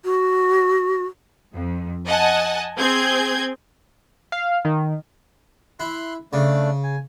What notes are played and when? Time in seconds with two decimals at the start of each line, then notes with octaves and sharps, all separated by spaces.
0.05 F#4
1.54 F2
2.06 D#5 F#5 G#5 A5
2.77 C4 G#4 G6 G#6
4.32 F5
4.65 D#3
5.80 E4 C6 F#6
6.33 C#3 A3 D4 D5
6.84 G#5